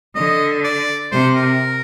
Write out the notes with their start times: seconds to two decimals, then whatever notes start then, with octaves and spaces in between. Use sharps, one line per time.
0.15 D3 D#5
0.64 D5
1.12 C3 C5
1.36 A#4